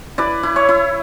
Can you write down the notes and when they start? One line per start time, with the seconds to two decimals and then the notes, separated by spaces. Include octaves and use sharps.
0.18 E4 B4 D5
0.43 E4
0.56 C#5 E5
0.69 E4